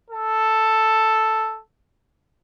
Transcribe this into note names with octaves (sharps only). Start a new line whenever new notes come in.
A4